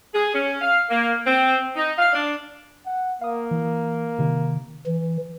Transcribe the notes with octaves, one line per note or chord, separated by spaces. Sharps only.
G#4
C#4
F5
A#3
C4
D#4
F5
D4
F#5
A#3 F5 D#6
E3
C3 D#3
E3